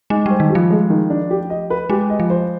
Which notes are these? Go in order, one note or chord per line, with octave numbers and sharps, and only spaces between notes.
G#3 D#4
G3 C5
D#3
G4
F3
G#3
D#3
D4
G4
D#5
B4
G#3 G4
D#5
F3
C5